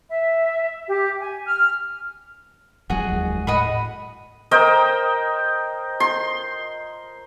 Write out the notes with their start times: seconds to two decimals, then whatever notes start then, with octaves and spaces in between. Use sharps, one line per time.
0.10 E5
0.88 G4
1.20 G#5
1.46 F6
2.90 F1 F#3 G#3 F#4 G#4
3.11 D#2
3.47 A2 D#5 F#5 B5
4.51 A#4 C5 D#5 G5
6.00 C6